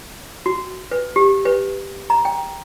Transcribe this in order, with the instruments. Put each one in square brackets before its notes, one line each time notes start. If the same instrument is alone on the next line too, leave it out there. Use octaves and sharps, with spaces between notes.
[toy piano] F#4
B4
G4
B4
A#5
G5